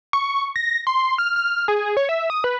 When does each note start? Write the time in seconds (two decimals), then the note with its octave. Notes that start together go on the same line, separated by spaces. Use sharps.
0.13 C#6
0.56 A#6
0.87 C6
1.18 F6
1.36 F6
1.68 G#4
1.97 C#5
2.09 E5
2.30 D#6
2.44 B4